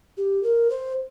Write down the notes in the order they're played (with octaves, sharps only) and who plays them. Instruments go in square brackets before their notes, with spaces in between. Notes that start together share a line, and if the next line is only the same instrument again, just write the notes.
[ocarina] G4
A#4
C5